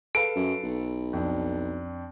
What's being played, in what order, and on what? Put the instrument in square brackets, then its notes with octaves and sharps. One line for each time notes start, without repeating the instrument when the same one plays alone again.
[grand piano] A4 B4 F5 [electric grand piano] D7
[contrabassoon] F#2
B1
[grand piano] F2 D4